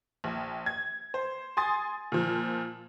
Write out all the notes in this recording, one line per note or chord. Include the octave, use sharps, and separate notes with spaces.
A#1
G#6
C5
G#5 C6 D#6 A6
A#2 F3